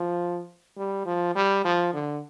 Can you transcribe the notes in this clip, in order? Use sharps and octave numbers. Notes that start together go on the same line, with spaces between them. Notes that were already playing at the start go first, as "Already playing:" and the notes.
Already playing: F3
G3
F3
G3
F3
D3